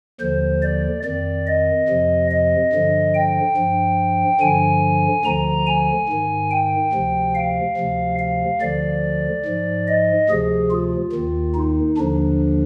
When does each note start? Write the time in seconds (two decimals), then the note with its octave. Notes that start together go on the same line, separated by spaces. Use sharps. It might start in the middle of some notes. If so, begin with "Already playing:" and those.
0.21 D#2 D3 F3 C5
0.63 D5
1.04 F2 D#3 D5
1.47 D#5
1.88 F2 C3 F3
2.31 D#5
2.73 G2 D3 F3
3.15 G5
3.57 G2 F3
4.40 G2 D3 F3 G#5
5.25 D2 D3 F3 A#5
5.67 G#5
6.09 G#2 D#3
6.51 G5
6.93 D2 C3 F3
7.35 F5
7.77 D2 C3 F3
8.19 F5
8.61 D2 D3 F3 D5
9.45 G#2 F3
9.88 D#5
10.29 D2 C3 F3 G#4
10.71 F4
11.13 D#2 D#3
11.55 D#4
11.97 D#2 D3 F3 D4